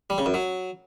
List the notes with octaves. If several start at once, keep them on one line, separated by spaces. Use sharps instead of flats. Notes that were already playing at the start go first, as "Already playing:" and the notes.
G3
C#3
F#2
F#3